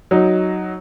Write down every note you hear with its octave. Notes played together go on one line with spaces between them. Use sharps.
F#3 D#4